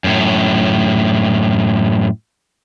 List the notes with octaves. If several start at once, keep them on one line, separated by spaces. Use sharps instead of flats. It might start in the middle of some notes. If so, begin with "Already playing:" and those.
F#2 A2